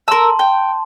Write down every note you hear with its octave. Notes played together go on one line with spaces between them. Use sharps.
A#4 A5 C6 E6
G5